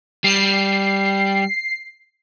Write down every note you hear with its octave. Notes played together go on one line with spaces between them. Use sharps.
G3 C7